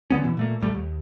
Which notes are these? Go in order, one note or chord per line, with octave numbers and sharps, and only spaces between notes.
D3 B3 C#4
B2 E3
A#2 A3 A#3
D#1 A#1 G3 A3
D#2